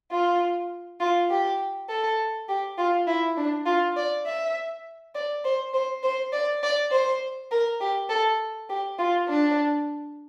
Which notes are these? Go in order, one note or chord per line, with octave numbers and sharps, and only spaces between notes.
F4
F4
G4
A4
G4
F4
E4
D4
F4
D5
E5
D5
C5
C5
C5
D5
D5
C5
A#4
G4
A4
G4
F4
D4